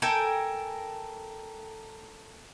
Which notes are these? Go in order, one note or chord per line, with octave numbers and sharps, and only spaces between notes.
A4 A#4 G5 G#5